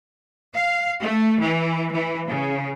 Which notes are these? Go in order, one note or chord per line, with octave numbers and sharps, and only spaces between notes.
F5
A3
E3
E3
C#3